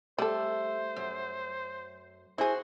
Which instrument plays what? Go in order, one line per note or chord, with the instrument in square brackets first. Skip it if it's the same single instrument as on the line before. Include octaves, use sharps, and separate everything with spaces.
[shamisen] G3 A4 [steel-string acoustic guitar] A3 [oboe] C5
[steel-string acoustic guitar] F#2
[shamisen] E4 G#4 [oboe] F#4 [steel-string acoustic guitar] C5 G#5